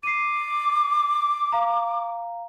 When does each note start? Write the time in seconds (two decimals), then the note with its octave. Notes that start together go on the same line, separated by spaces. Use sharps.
0.03 D6 C7 D#7
1.52 F5 A#5